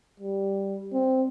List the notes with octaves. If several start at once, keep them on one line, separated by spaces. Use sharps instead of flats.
G3
C4